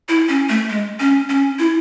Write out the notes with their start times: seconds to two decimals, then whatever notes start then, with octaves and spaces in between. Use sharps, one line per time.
0.09 E4
0.29 C#4
0.49 A3
0.69 G#3
1.00 C#4
1.30 C#4
1.59 E4